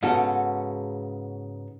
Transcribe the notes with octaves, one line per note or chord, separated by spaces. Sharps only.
G#2 C#3 B3 F#4 A4